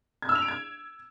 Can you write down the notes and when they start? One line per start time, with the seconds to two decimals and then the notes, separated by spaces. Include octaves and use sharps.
0.22 G#6
0.29 E6
0.35 F7
0.42 D7
0.48 G#6